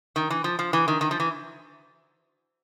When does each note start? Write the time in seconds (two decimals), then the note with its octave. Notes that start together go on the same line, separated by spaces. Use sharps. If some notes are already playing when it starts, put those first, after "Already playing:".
0.16 D#3
0.30 E3
0.44 F3
0.59 F3
0.73 E3
0.88 D#3
1.01 D#3
1.11 F3
1.20 E3